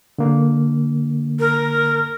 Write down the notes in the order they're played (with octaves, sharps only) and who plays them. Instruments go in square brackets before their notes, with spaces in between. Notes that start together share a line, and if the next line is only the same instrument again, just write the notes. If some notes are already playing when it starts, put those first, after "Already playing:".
[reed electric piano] D3 A#3
[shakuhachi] A#4